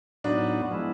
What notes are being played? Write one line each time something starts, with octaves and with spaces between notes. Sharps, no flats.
A2 F#3 B3 D4 D#4 F#4
F3 G#3 B3 E4